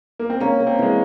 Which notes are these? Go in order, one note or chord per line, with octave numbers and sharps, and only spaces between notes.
A#3
C4
A#3 C#4
A#3
C4
E3 G#3